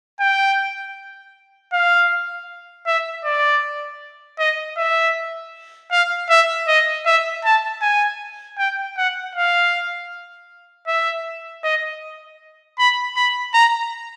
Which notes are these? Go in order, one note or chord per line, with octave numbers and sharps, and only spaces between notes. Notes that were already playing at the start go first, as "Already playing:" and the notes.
G5
F5
E5
D5
D#5
E5
F5
E5
D#5
E5
A5
G#5
G5
F#5
F5
E5
D#5
B5
B5
A#5